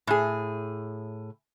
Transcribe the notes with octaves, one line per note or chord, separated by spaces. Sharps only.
A2 G#4